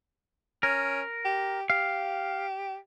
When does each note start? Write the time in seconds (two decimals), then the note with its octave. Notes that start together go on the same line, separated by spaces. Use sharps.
0.63 C#4 A#4
1.25 G4
1.70 G4 F5